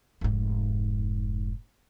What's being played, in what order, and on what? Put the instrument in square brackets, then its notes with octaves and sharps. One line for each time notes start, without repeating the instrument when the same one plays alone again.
[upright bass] F1 G#2